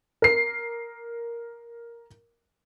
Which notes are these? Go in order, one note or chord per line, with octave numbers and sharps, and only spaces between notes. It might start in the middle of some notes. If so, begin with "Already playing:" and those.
A#4 C7